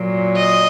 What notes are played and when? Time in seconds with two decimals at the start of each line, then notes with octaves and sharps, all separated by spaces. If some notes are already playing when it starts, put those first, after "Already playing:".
Already playing: A#2 F#3
0.37 D#5